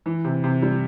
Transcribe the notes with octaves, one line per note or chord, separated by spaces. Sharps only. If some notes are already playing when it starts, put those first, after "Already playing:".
E3
C3
C3
G3